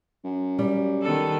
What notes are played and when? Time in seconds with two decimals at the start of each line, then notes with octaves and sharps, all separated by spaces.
0.25 F#2
0.59 G3
1.03 D#3 B3 A4